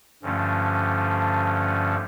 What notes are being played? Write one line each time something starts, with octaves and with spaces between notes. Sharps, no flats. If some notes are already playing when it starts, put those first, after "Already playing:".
G2 D3 F3 A3 C#4